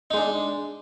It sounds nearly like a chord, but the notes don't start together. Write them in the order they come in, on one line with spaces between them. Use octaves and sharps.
D#4 G#3 D4